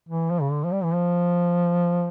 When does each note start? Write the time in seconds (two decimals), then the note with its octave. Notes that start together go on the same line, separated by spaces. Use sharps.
0.09 E3
0.30 F3
0.42 C#3
0.51 D3
0.64 F3
0.73 G3
0.84 E3
0.94 F3